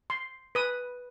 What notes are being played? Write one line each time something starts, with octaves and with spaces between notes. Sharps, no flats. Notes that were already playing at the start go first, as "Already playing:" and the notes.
C6
B4 D#6